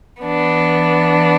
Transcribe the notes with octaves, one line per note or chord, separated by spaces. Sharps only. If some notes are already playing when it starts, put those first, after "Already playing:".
E3 B3 D4